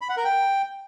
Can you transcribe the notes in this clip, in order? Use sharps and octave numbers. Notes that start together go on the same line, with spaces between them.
B5
F#5
A#4
G5